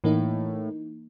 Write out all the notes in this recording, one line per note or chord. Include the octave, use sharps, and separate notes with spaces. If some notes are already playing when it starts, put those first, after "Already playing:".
A2 E3 A#3 D#4